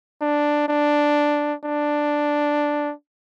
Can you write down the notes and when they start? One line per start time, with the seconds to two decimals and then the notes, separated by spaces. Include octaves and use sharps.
0.21 D4
0.68 D4
1.64 D4